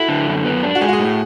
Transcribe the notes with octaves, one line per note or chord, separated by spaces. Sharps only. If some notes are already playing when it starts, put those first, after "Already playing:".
Already playing: E4 F#4 A4
D3
F#2
B3
D4
F#4
G#3 G#4
F#4
G#4
A2